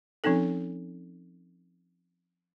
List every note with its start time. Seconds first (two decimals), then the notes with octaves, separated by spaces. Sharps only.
0.24 F3 C4 C#4 D#4 A4